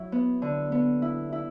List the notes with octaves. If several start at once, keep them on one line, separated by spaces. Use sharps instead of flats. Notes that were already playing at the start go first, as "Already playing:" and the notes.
Already playing: F#3 E4
B3
D3
B3
E4
E4